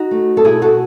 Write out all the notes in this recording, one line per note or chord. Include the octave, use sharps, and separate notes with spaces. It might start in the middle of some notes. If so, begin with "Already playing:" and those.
Already playing: D#4 F#4
A3
A4
B2 E4 G#4
F#4 A4